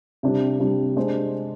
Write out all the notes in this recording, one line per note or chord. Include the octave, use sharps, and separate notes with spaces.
C3 G3 D4 G4
C3 G3 D4 G4
G#3 D4 G#4 C5